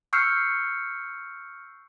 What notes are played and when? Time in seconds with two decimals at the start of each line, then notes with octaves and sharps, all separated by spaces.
0.13 C#6 E6 F6 G6 C7 C#7